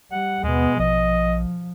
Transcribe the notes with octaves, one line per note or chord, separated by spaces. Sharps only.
G3 F#5
D#2 B2 G#3 B3
A#1 F3 D#5